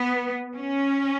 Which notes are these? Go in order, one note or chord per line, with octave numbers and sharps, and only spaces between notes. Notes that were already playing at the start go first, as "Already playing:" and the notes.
Already playing: B3
C#4